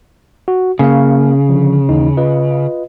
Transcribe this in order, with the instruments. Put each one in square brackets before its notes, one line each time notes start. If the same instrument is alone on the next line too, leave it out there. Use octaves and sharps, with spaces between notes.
[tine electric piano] F#4
[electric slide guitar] C#3 [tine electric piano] A#3 A#4 F5
[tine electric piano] D3 F3
D#2 E3 D#4
F4 B4 D#5